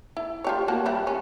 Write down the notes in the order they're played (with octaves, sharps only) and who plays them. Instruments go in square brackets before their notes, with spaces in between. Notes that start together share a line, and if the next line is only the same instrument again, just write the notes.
[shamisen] E4
F4 G4 C#5
A#3 F#4 A5
E3 G3 E4
C#4